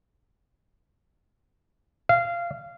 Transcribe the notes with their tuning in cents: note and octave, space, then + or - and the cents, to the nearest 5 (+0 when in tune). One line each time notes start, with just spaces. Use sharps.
F5 -20